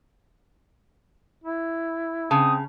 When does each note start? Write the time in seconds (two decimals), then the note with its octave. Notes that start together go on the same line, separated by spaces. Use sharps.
1.44 E4
2.31 C#3 C4 A5 D#6